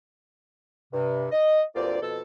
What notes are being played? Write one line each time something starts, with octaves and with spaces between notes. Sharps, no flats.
G2 C3
D#5
D2 G2 A#3 C4 F4 D5
F2 B2 A4